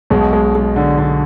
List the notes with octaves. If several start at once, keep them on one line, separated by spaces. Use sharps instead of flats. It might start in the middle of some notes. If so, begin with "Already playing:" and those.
B1 B2 G#3
G#3
G#3
D3
D3